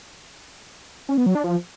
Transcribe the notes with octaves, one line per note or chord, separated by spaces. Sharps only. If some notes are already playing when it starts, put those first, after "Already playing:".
C#4
B3
F#3
D4
F3